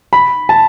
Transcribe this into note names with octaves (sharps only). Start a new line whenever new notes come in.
B5
A5